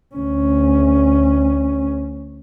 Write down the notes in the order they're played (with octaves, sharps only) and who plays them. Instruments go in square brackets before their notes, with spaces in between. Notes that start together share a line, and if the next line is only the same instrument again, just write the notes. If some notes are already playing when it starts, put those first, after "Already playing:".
[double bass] D2 C#4